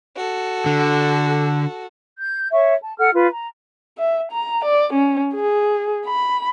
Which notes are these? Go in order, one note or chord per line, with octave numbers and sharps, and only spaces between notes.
F#4 A4
D3
G6
C#5 E5 C#6
A5
A4 F#5 F6
F4 B4
A#5
E5
A#5
D5
C#4
G#4
B5